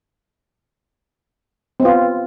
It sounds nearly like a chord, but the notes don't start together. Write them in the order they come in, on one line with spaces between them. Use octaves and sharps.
C4 B3 F4